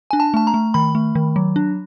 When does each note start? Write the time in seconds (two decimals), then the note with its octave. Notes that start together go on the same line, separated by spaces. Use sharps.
0.11 D4 G#5
0.20 A5
0.34 A3 A5
0.47 A#5
0.54 A3
0.74 D#3 B5
0.95 A3
1.15 D#3
1.36 F#3
1.56 D4